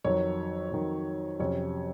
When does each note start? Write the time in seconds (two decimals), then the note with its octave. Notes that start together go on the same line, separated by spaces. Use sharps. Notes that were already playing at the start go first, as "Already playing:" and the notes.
0.04 F2 D#3 F#3 C#5
0.72 F2 D#3 F#3
1.40 F2 C3 F#3 C#4 C#5